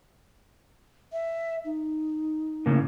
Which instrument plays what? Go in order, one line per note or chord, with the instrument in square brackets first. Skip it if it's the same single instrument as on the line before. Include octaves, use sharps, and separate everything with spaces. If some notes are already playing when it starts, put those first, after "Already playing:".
[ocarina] E5
D#4
[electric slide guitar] A2 C#3 A#3